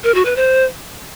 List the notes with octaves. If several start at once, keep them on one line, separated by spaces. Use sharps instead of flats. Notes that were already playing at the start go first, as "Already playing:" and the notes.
A#4
F#4
B4
C5